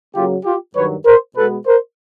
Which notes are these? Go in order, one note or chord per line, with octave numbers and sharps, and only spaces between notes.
C#3 F#3 A#3 F4 G4
F4 G4
G2 D#3 F#3 B4 C#5
A#4 C5
B2 G#3 B3 A4 B4
A#4 C5